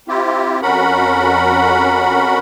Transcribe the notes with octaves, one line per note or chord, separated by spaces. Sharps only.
C4 E4 F4 G4
F2 C#4 F#4 A#4 F#5 B5